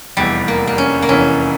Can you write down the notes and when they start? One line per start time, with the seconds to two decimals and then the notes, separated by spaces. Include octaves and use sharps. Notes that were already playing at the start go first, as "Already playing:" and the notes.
0.17 F1 E2 E3 G3
0.48 A#3
0.67 A#3
0.78 C#4
1.02 A#3
1.09 F1 E2 E3 C#4